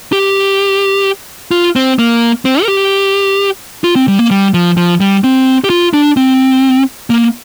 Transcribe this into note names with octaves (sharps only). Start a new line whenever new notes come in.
G4
F4
C4
A#3
C4
A#4
G4
F4
C4
G3
A#3
G3
F3
F3
G3
C4
G4
F4
D4
C4
A#3